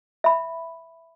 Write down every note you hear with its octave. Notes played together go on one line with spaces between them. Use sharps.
E5 B5